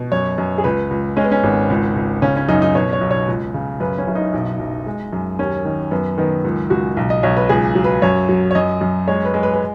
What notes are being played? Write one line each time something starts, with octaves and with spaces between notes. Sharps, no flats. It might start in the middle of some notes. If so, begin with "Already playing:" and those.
Already playing: B2
F#2 C#5
F#2
G#4
C#2 B4
C#2
G#3 C#4
B3
C#4
G#1
C#2
C#2
C#3 C#4
C#4
F#2 D#4
D#4
B2 C#5
C#5
B1
C#5
C#2
C#3
F#2 B4
C#4
F#1
D#4
B1
B1
G#3
F#2
D#2 C#4
D#3
F#2 B3
D#3 B3
C#2
C#2 F#4
B1
D#5
B1 C#5
B4
C#2 G#4
F#3
B4
F#2 C#5
F#3
C#5
F#2 D#5
F#2
G#3 C#5
B4
G#3
B4
B4